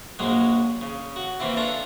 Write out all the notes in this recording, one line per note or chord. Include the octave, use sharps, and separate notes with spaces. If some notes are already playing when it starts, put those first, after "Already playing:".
A#1 F#3 G#3 A#3
C#3
F#4
E3 A#3 C4 E4
D4 F4 A4 C#5 A#5